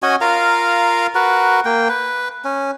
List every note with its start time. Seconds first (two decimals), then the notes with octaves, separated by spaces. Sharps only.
0.03 C#4 F#4 D#5 G#5
0.21 F4 A#4 F5 A#5
1.15 F#4 A#4 B4
1.65 A#3 G5
1.89 B4
2.45 C#4